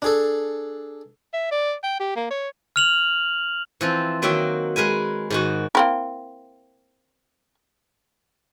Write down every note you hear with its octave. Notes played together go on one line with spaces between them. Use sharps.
D4 G#4 A4
E5
D5
G5
G4
A#3
C#5
F6 F7 F#7
E3 F3 C4
D#3 F#3 A#3 F#4 E5 G5
G#3 A#4 B4 G#5
G#2 D#3 F#4
A#3 C4 E4